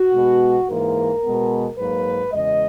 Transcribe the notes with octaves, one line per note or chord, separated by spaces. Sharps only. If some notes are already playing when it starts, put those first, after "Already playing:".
Already playing: F#4
B2 G#3 B3
G#2 E3 A#3 A#4
B2 G#3 B3
G#2 F#3 A#3 B4
E2 C#3 G#3 D#5